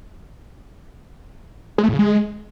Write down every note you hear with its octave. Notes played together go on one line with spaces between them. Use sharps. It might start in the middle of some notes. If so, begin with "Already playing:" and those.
G#3
A3
A2
C#3
G#3